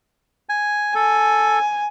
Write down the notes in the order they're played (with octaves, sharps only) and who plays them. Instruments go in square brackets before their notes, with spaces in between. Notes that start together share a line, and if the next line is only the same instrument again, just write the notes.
[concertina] G#5
[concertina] A4 [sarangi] G#5